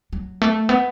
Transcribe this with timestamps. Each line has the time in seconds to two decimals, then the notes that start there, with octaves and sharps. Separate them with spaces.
0.13 F#3
0.41 A3
0.69 B3